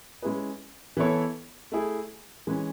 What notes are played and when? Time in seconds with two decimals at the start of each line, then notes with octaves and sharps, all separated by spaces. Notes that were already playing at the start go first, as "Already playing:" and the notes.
0.22 G#3 C#4 E4 G#4 B4
0.97 E3 B3 E4 A4 C#5
1.72 A3 E4 G#4
2.47 E3 G#3 C#4